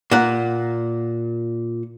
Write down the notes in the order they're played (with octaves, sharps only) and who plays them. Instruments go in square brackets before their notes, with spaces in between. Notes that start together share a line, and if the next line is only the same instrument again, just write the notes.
[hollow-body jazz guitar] A#2 F#5